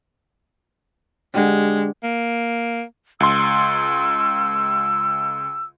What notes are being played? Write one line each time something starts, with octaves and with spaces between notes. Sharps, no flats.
D3 G#3 G4
A#3
C#2 C6 E6